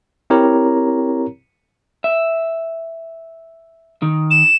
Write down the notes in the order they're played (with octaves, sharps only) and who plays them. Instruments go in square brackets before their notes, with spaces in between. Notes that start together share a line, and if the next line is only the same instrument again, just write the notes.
[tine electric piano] C4 E4 G4 A#4 C#5 A#5
[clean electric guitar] E5
D#3
[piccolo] E7